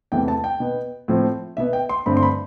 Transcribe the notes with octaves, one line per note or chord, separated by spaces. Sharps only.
E2 C3 E3 A3 G5
A5
G5
B2 B3
A2 F3 C4
B2 B3 E5
G5
C6
G2 D3 A3 C4 B5
C6
B5